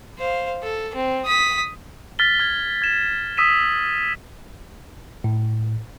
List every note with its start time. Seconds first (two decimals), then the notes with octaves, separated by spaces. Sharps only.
0.18 C5 F5
0.63 A4
0.95 C4
1.25 D#6 B6
2.19 F6 A6 B6 G7
2.40 F6 G#6
2.82 G#6 E7
3.37 D#6 E6 B6 D#7 E7
5.24 A2